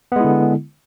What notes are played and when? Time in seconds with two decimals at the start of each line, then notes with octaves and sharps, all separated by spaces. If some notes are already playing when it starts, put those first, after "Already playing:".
0.12 B3
0.16 G#3
0.20 E4
0.24 D3